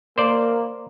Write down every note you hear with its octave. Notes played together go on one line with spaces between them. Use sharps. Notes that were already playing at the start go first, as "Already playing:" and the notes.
A#3 C5 D5